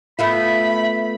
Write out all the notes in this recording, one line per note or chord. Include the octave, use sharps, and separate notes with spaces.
A3 B3 F4 E5 F5 B5